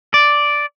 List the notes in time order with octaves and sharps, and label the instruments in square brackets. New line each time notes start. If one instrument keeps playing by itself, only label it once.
[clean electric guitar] D5